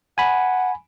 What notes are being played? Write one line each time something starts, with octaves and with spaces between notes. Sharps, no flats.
F#5 G#5 B5